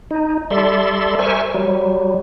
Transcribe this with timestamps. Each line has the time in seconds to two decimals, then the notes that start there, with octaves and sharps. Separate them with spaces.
0.11 D#4
0.50 G3 A4 D5 E5 C6
1.19 A#4 C5 E5 G#5 C#6
1.54 F#3 G3